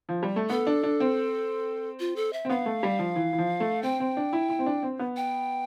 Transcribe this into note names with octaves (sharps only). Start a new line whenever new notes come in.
F3
G3
A3
B3 A4
D4
D4
C4
F4
A4
E5
C4
B3 F5
A3
G3
F3
E3
E3
F3
A3
C4 G5
C4
D4
E4
E4
C4
D4
C4
B3
G5